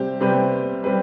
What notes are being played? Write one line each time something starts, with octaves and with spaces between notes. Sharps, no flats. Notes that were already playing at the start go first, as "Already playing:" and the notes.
Already playing: C3 G3 C4 G4
C3 G3 C4 G4 B4
G3 C4 G4 B4